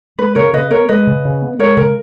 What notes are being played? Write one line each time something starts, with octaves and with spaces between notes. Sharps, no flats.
G#3 B4
C#3 A#4 C#5
C#3 B4 D#5
B3 A#4 C#5
G#3 B4 D#5
C#3
C#3
B3
G#3 A#4 C#5
C#3 A#4